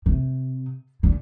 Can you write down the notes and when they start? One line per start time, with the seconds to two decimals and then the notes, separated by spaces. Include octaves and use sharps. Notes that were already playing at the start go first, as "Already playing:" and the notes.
0.06 C3
1.03 D3